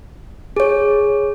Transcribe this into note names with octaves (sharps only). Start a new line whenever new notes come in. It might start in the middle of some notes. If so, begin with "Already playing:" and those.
G#4 C#5